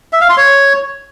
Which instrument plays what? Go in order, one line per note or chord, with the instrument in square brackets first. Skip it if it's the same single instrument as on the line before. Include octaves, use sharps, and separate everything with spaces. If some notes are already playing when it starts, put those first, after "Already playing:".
[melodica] E5
F5
C6
C#5